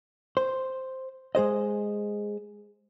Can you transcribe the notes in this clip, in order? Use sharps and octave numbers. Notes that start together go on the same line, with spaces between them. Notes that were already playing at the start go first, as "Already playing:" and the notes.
C5
G#3 G#4 C5 D#5